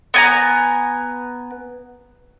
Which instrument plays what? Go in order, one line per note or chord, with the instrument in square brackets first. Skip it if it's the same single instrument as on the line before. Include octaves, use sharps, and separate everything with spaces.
[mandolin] B3 G#5 A#5